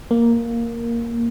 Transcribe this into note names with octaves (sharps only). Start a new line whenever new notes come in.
A#3